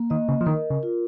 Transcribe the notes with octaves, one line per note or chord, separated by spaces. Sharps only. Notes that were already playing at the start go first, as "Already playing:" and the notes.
Already playing: A#3
D#3 D#5
C#3
F3
D#3 A#4
C#3
F4